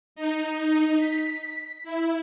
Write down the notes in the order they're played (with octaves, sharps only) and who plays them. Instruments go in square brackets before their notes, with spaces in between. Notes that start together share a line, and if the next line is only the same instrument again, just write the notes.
[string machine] D#4
B6
E4